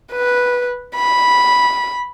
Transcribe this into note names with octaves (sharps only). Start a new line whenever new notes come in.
B4
B5